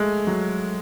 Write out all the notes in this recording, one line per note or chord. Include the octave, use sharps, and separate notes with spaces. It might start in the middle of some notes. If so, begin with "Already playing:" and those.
Already playing: G#3 A3
F#3